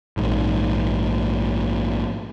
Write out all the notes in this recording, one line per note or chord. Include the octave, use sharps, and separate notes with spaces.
A#1 G#2